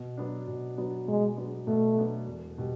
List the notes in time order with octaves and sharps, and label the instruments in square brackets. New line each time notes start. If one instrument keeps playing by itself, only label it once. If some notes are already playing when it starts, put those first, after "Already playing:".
Already playing: [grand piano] B2
F#3 B3 D4
B2
F#3 B3 D4
[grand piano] B2 [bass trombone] G#3
[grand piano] F#3 B3 D4
[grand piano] B2 [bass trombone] A3
[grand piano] F#3 B3 D4
E1
B2 G3